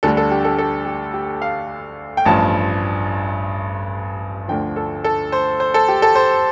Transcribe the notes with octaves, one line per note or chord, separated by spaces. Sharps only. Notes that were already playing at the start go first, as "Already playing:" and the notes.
D2 D3 G3 A4
A4
G4
A4
A4
G4
G4
F5
G5
A1 G2 F3 A5
D2 D3 F3 G5
A4
A4
C5
C5
A4
G4
A4
C5